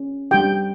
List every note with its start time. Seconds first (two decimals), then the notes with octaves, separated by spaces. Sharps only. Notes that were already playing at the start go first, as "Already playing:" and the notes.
Already playing: C#4
0.31 G3 D4 G4 G5